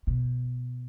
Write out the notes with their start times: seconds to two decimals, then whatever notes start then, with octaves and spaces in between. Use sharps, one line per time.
0.07 B2